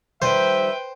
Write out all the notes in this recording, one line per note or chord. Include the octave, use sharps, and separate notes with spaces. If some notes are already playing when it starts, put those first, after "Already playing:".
D#3 F3 G3 B4 C5 E5 G5